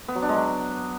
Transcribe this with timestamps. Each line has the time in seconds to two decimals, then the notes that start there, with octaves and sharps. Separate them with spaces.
0.08 B3
0.15 F#3
0.22 D4
0.29 G#3
0.36 F#3